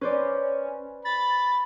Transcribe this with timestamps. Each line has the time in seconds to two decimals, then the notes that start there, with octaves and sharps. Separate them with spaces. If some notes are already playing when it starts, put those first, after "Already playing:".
0.01 C#4 B4 C5 D5
1.05 B5 A6